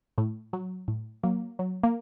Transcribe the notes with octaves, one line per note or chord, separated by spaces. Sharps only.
A2
F#3
A2
F#3 A#3
F#3
A#3